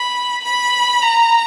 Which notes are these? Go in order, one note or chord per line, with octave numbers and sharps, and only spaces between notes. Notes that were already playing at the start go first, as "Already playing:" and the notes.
Already playing: B5
B5
A#5